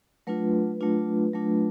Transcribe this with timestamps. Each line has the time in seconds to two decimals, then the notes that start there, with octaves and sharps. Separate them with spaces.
0.27 F#3 A3 D4 F4 B4
0.81 F#3 A3 D4 F4
1.33 F#3 A3 D4 F4